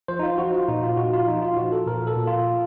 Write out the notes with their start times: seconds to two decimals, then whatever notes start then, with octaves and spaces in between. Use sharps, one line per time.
0.08 F3 C5
0.19 D#4
0.23 F4
0.38 F3 F#4
0.53 F4
0.68 A#2 D#4
0.83 F4
0.97 A#2 F#4
1.13 F4
1.27 F3 D#4
1.42 F4
1.57 F3 F#4
1.72 A4
1.87 A#2 A#4
2.07 A4
2.17 A#2
2.27 F4